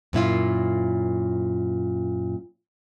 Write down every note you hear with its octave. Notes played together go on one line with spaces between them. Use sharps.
F#2 A#2 E4 F4